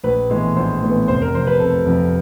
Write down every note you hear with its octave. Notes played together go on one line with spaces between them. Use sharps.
A#1 B4
A2 E3 G#3 B3
A#1 C5
A2 E3 G#3 B3
F1 C5
A#4
F2 C3 C5
B4
F1 A4
F2 C3